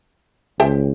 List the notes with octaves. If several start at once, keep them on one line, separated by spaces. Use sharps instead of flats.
C#2 C5 E5 G5